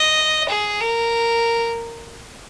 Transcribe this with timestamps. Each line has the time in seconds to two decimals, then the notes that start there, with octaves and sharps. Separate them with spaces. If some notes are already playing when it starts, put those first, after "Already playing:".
Already playing: D#5
0.50 G#4
0.81 A#4